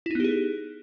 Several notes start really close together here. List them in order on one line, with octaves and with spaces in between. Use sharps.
E4 D#4 B3 G4 G#4